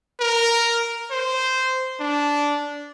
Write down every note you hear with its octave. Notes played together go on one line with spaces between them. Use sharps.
A#4
C5
D4